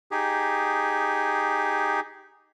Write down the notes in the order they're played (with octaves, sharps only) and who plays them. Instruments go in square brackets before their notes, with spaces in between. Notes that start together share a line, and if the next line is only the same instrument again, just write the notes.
[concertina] D#4 G4 G#4